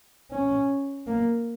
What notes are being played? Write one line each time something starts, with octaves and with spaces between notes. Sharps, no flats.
C#4
A#3